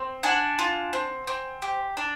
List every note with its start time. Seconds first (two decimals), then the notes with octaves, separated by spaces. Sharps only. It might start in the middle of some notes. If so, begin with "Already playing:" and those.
Already playing: C4
0.23 D4 F#5 G#5
0.59 F4
0.93 C4
1.27 C4
1.62 G4
1.97 D4